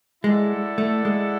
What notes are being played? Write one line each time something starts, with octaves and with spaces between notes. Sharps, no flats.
G#3 E4 A4 D5 F#5
A3
G#3